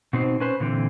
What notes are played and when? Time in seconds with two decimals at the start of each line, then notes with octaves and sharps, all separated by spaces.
0.13 B2 C4 D#4 C5
0.40 C#4 B4 C5
0.60 A#2 D3 E3 C4